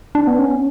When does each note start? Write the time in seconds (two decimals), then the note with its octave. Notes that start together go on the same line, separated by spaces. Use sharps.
0.15 D4
0.27 B3
0.39 C#4